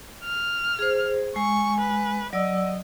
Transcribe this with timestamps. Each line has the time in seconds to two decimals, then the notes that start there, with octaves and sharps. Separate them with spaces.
0.24 F6
0.79 G#4 C5
1.36 G#3 G#5 C#6
1.81 B4
2.33 F#3 D5 D#5 E6